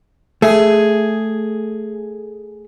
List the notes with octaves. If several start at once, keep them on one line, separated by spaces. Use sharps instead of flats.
A3 G#4